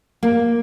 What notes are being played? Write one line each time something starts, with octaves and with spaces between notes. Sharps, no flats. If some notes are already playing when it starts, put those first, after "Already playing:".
A#3